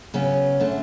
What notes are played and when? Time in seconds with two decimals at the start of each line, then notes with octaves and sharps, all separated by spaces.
0.14 C#3 F#3 B3 C#4
0.60 D3 A3